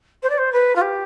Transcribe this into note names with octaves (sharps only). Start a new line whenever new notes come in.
C5
D5
C5
B4
F4
G4